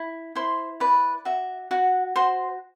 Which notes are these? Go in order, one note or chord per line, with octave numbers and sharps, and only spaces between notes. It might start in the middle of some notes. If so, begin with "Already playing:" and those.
Already playing: E4
E4 C5 C6
B4 D5 B5
F#4 E5
F#4 F#5
F#4 C5 C6